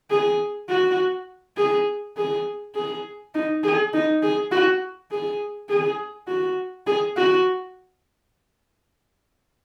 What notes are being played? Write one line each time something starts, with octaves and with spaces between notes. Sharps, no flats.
G#4
F#4
G#4
G#4
G#4
D#4
G#4
D#4
G#4
F#4
G#4
G#4
F#4
G#4
F#4